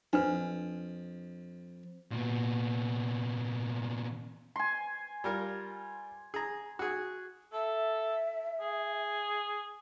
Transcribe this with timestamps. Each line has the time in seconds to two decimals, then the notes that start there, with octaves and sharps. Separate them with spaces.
0.13 F2 D4 B4
2.11 A#2 B3
4.56 G#5 C6
5.24 G3 F4 A#4
6.34 G#4 A#5
6.79 F#4 G#4
7.53 A4 E5
8.61 G#4